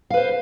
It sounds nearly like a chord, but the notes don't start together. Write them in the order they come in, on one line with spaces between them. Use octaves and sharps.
F5 B4 C5